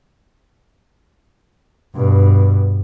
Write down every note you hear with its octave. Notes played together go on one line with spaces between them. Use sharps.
G2 B2